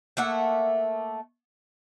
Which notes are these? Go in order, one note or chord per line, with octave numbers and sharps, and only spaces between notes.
A3 A#3 E5 F#5